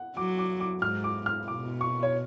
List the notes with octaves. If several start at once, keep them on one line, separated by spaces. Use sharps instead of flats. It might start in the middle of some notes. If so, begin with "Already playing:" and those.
Already playing: F#5
F#3 D6
D6
D6
G#2 F6
D6
F6
B2 D6
C#6
C#5